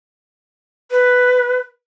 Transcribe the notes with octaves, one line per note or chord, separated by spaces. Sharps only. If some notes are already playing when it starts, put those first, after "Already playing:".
B4